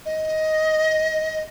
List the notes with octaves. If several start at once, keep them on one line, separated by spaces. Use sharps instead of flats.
D#5